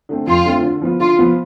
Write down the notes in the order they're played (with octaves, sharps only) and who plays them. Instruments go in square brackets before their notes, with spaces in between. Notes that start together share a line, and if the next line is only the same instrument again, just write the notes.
[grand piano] D3 A3 C4
[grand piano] F2 [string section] F4
[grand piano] D3 A3 C4
D3
F3 B3 F4
[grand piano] D3 [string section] F4
[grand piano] F3 B3 F4